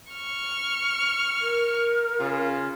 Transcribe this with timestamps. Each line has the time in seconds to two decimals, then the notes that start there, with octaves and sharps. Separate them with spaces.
0.14 C#6 F6
1.41 A#4
2.20 C#3 F4